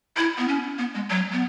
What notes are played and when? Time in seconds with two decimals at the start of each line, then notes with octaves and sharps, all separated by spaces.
0.17 E4
0.38 B3
0.48 C#4
0.79 B3
0.95 G#3
1.10 F#3
1.32 B3